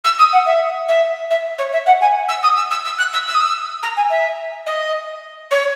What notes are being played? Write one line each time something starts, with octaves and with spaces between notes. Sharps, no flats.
E6
D#6
F#5
E5
E5
E5
C#5
E5
F#5
G#5
E6
D#6
E6
E6
E6
F#6
E6
E6
D#6
E6
A#5
G#5
E5
D#5
C#5